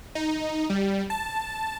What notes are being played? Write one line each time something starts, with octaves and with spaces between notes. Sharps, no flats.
D#4
G3
A5